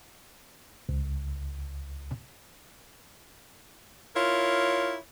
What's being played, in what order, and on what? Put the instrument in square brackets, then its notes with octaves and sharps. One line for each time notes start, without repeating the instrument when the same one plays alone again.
[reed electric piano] C#2
[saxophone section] E4 F4 A#4 C#5